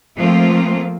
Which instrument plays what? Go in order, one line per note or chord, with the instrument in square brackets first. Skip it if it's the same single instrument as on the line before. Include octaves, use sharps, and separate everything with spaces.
[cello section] F3 A3 A#3 C4 F4